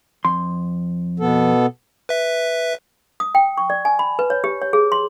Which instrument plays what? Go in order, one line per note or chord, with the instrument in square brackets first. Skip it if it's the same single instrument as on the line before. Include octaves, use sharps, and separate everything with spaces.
[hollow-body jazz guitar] F2 C6
[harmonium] B2 B3 A4
[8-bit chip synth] B4 E5
[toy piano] D#6
G5
C#6
D5
G#5
B5
B4
C#5
G4
C#5
G#4
C6